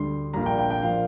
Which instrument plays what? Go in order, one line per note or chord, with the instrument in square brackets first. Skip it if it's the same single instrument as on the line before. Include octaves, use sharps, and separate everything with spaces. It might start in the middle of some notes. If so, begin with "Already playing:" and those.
Already playing: [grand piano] D2 D3 G3 C6
A#1 A#2 G3 A#5
G5
G5
G5
A#2 F3 F5